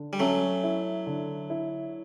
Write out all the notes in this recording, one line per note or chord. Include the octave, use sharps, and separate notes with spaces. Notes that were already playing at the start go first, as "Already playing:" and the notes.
Already playing: D3
G3
F#3 A3 C#4
E4
D3
E4